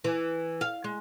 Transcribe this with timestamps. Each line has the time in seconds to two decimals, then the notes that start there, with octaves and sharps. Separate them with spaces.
0.04 E3
0.61 F5
0.84 G#3